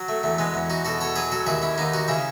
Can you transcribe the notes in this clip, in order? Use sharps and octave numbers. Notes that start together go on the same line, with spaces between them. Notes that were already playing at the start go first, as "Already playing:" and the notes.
Already playing: F#3
A3
E2 A3
G#3 B3
E2
D#4 F#4
B2 F#4 A4
A4 C#5
F#3 G#4 B4
F#4 A4
D#2 E4 G#4
C#4 E4
D#2 B3 D#4
D#4 F#4
C#3 C#4 E4